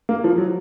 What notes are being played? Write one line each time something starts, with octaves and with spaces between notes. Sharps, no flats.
A#3
F3
F#3